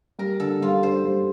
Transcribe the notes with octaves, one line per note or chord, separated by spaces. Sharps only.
G3 A#4
D3 A4
G3 F4
D4 C5
G3